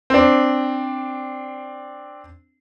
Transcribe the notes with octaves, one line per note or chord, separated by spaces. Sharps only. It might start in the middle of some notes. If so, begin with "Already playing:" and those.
C4 D4